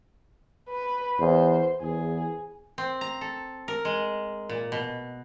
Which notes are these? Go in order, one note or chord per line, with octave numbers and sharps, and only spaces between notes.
B4
E2 C5
E2 G#4
C4
A#5
A4
A#4
G#3
A#2
B2